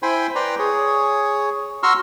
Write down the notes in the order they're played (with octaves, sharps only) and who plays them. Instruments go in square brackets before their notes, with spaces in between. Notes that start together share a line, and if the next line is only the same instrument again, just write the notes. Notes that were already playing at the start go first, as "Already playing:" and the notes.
[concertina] E4 C5 G5 G#5 B5 C6
B4 D5 G5 A#5 C6
G#4 C#5
F#4 A#5 C6 C#6 E6 F6